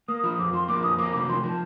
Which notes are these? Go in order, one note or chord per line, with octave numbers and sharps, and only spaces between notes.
A#3 D#6
F3 D#6
F2 D6
F3 C6
A#3 D6
F2 D#6
A#3 D6
C3 D6
F3 C6
F3 A5